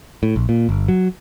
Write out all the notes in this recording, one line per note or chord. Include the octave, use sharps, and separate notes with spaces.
A2
A#1
A#2
G1
F#3